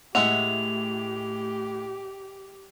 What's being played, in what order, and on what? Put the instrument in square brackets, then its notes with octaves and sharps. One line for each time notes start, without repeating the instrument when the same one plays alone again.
[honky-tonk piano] A2 [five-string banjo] G#3 E5 F#5 [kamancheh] G4 [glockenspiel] F7